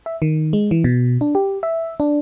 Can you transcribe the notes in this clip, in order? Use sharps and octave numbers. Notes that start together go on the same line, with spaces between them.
E5
D#3
G#3
E3
B2
D4
G4
E5
D4